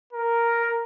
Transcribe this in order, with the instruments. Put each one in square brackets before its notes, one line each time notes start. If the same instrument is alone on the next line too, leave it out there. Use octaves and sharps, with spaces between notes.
[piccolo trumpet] A#4